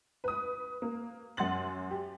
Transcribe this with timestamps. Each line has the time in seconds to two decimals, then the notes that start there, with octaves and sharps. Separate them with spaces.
0.24 B4 D#6
0.82 A#3
1.37 F#2 F#5 C6 A6 F#7
1.91 G4